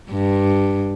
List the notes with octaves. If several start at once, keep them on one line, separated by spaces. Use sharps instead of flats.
G2